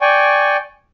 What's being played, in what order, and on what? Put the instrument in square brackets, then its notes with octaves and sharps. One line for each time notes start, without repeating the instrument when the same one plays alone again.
[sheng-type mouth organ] D5 G5 G#5 C#6